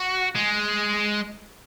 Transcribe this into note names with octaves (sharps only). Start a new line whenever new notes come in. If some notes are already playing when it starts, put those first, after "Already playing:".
Already playing: F#4
G#3